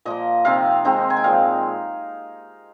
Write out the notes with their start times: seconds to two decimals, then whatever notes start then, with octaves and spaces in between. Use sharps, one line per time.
0.05 A#2 F3 A#3 D#5
0.45 C3 F3 C4 D#4 F5
0.85 D#3 G#3 C4 D#4
1.10 G#5
1.17 G5
1.24 A#2 F3 G#3 F5